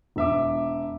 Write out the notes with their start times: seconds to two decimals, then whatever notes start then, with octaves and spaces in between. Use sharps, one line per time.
0.16 E1 E5 D6